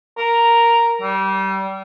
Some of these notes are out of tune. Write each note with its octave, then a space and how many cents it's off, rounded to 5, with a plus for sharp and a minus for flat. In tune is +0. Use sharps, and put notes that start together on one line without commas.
A#4 +0
G3 -25